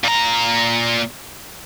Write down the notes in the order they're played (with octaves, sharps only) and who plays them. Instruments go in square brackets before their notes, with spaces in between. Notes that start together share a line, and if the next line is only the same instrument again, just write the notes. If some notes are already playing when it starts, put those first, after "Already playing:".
[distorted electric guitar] A#2 A#5